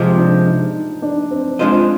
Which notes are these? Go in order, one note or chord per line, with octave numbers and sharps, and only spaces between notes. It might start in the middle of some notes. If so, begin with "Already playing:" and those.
Already playing: C3 F3 G#3 C4
D4
D#4
D#4
D4
C4
G#3 C4 D4 F4 C5 D#5